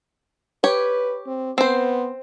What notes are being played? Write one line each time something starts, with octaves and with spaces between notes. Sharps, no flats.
G4 B4 C#5
C4
B3 C4 C5